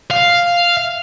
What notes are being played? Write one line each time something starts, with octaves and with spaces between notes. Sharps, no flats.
F5